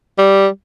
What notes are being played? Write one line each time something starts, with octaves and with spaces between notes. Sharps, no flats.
G3